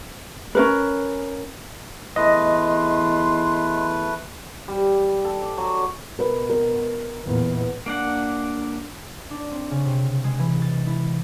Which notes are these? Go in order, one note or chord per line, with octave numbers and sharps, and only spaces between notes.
C#4 A#4 B4
E2 A3 B4 D#5 C6
G3
A4
D5
F#3
B2 A#4 B4
A#4
E2 A#2
A#3 D4 F#5
D4
C4
C#3
C3
G#3
E3
A6
E4